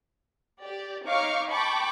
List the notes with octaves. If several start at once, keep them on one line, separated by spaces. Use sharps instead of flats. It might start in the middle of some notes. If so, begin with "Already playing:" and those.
G4 D5
D#4 C#5 F5 C#6 D6 F6
G5 A5 B5 C#6 D6